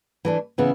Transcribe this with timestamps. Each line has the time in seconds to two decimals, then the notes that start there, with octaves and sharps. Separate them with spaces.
0.25 E3 A3 D4
0.58 C#3 E3 B3 E4